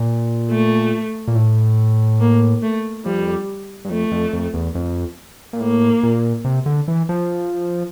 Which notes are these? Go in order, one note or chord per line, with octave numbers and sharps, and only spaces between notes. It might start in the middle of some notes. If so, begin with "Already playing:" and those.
Already playing: A#2
A3
A#2
A2
A#3
A3
F2 G3
G2
F2 A3
F2
F2
E2
F2
A#2
A2 A#3
A#2
C3
D3
E3
F3